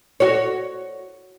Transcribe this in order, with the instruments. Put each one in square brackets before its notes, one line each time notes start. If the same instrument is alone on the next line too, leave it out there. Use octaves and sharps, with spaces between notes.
[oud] F#4 C#5